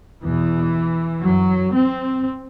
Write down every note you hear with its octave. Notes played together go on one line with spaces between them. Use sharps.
E2 B2 E3
F#2 F#3
C4